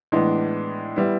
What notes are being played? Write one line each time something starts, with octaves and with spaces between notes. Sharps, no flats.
A2 E3 G#3 B3 D4
G3 B3 E4